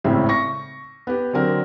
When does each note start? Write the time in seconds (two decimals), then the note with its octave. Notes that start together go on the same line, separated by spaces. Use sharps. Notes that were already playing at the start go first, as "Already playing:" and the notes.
0.04 G#1 A2 C#3 C4 E5
0.29 C#6 A#6
1.07 B3 G4
1.33 D3 F#3 C4 A#4